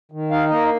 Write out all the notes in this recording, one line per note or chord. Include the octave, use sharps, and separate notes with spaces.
D#3
D#4 F5
A#3 D#5